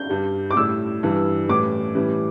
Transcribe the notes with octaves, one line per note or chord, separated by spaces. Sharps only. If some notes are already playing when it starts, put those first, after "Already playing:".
Already playing: G6
G2 G3
D6
A2 G3 E6
G2 E3 G3
A2 E3 G3 D6
A2 E3 G3